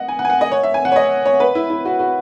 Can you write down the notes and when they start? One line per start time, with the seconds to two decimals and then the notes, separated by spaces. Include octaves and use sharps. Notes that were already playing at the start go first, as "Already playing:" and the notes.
Already playing: D#5 F#5
0.08 G#5
0.19 F#5
0.25 G#5
0.30 F#5
0.41 D#5
0.52 C#5
0.63 E5
0.74 G#5
0.85 F#5
0.92 C#5
0.96 D#5
1.26 C#5
1.40 B4
1.55 E4
1.70 E4
1.85 F#4
1.99 F#4